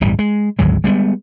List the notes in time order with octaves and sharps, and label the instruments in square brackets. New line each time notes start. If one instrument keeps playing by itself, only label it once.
[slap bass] D1 G1 E3 G3
G#3
G#1 D2 F#3 G#3
G3 G#3 A#3 B3